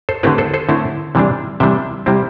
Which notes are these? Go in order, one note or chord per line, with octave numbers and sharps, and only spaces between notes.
A4 C5
D3 A3 C4 E4 G4 B4
A4 C5
A4 C5
D3 A3 C4 E4
C3 E3 G3 D4
C3 E3 G3 D4 E5 G5
C3 G3 C4 E4